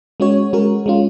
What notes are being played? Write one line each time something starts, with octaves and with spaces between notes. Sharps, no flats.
G#3 C#4 F#4 C#5
G#3 C#4 F#4 A#4
G#3 C#4 F4